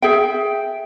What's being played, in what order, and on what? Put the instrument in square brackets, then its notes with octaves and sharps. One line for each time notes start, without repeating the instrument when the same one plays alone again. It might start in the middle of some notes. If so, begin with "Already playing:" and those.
[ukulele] G#4 E5 G5